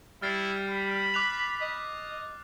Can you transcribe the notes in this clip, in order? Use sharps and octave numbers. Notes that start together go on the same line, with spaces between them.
G3 E4 F6 A6 C7
B5
D6 F#6 F7
D#5